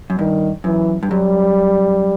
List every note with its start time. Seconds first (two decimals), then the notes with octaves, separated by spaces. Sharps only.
0.10 F#2
0.19 G2 D#3
0.64 F#2 E3
1.03 G2
1.11 F#2 G3